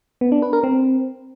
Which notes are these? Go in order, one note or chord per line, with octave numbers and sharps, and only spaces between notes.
B3
D4
B4
A#4
C4